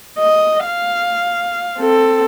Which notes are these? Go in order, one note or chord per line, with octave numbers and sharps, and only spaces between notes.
D#5
F5
C4 A4